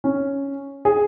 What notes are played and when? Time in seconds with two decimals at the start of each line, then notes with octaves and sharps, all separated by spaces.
0.04 C#4
0.85 G#4